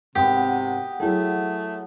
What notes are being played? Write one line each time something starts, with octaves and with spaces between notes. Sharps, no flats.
G#1 C3 B3 F#4 G4
F#3 A3 E4 G#4